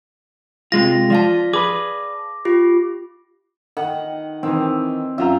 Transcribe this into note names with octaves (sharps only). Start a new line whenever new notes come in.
C3 G#3 F4 A#6
F3 D5 F5 A5
G#4 B4 D6
F4 G4
D#3 F#5
D#3 E3 C4
F#2 F4 E5 A#5